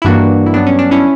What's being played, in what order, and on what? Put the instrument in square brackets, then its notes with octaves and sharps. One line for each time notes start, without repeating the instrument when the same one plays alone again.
[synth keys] E4
G2 E3 A#3 D4 F#4
E4
G2 F#3 B3 D4
C#4
D4
C#4 E4